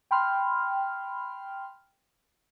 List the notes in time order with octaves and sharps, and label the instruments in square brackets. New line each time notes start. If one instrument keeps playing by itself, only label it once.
[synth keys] G5 B5 C6 F6